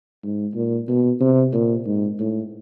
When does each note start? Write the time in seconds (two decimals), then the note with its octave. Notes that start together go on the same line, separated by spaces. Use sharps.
0.23 G#2
0.55 A#2
0.88 B2
1.20 C3
1.53 A#2
1.86 G#2
2.19 A2